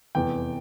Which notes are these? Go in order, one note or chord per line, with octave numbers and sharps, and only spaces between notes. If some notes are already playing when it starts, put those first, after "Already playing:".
F1 E2 E3 G5